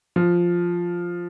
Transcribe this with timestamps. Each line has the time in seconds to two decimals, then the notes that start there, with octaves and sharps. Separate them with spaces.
0.16 F3